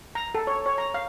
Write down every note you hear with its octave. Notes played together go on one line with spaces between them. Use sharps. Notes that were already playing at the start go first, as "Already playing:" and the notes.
A#5
A4
C#5
C#5
A#5
F5